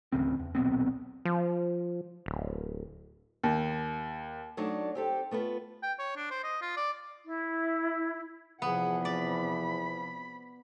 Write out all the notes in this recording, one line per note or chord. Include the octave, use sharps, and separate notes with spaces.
A1 D2 C#3 C4
E2
D#1 B1 B3 C4
F3
D1
D#2
F#3 A3 D4 D#4 D5
C4 G4 A4
A3 B3 F4 B4
G5
C#5
D4
C5
D#5
F4
D5
E4
E2 C3 F3 B3 G#4 F#5
D5 B5